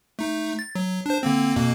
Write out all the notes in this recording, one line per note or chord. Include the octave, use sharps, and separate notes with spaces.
A3 D#4
A6
F#3
D4 C5
D3 A#3 C4
F2 B2 A#3